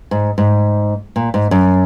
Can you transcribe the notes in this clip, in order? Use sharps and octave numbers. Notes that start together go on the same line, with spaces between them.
G#2
G#2
A#2
G#2
F#2